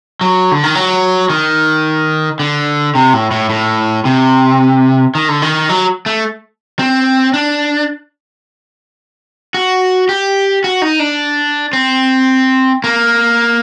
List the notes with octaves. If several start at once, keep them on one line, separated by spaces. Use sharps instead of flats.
F#3
D3
D#3
F#3
D#3
D3
C3
A2
A2
A2
C3
D#3
D3
D#3
F#3
A3
C4
D4
F#4
G4
F#4
D#4
D4
C4
A#3